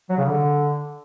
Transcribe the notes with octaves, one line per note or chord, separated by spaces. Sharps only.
F#3
C#3
D3